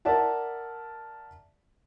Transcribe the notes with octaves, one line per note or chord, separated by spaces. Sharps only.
A#4 D5 E5 F#5 A5